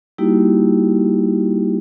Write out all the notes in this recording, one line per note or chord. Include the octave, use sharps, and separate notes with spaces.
G3 A#3 D#4 E4 F#4 G4